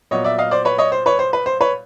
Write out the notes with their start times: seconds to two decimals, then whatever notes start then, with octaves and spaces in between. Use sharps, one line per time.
0.11 A#2 F#3 B3 C#5 D#5
0.24 D5 E5
0.38 D#5 F5
0.51 C5 D5
0.65 B4 C#5
0.78 C#5 D#5
0.92 C5
1.06 B4 C#5
1.19 C5
1.33 B4
1.46 C5
1.61 B4 C#5